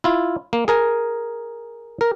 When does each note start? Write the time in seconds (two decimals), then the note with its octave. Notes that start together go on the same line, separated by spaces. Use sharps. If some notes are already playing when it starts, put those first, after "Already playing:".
0.04 E4 F4
0.53 A#3
0.68 G#4 A#4 G#5
2.01 A#4